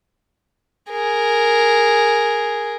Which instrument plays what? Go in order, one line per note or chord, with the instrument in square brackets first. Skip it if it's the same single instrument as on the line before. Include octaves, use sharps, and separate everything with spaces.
[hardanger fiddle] G#4 A#4